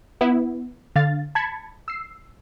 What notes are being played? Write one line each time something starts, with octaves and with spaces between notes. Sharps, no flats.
B3 E4
D3 F5 A6
A5 B5 G#6 B6 C#7
E6 C7